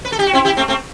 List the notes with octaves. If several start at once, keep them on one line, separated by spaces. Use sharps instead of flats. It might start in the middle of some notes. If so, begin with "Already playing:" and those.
B4
A4
G4
F#4
C4 E4
E4 G4
A3 C4
A3 C4